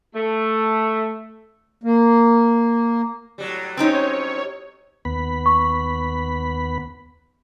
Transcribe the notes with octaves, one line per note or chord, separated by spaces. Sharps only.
A3
A#3
A2 F#3 G3
C4 C#4 D#4 C#5
D#2 B3 B5
C#6